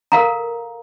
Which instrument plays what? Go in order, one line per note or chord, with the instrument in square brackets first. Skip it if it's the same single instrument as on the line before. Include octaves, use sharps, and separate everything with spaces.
[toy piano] A4 A#4 F5 A#5